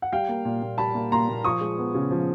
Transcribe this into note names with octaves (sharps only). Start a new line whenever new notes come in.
F#5
G3 F5 G5
A#3
A#2
A#2
G3 A5 B5
A#3
A#2 A#5 C6
A#2
F3 C#6 D#6
G#3
B3
C#3
F3